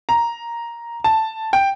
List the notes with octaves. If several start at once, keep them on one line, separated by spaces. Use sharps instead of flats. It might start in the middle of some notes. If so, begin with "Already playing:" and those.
A#5
A5
G5